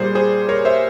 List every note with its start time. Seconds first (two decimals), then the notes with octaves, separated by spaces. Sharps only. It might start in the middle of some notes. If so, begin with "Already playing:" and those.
Already playing: A#2 G3 A#3 G#4 C5
0.15 G#4 C5
0.49 A#4 C#5
0.65 C5 E5